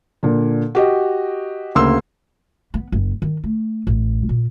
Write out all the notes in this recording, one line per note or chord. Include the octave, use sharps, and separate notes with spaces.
A#2 D3
F#4 G4 D#5
D2 C#3 A#3 C6 E6
B3
F#1
D#3
A3
A1
A#2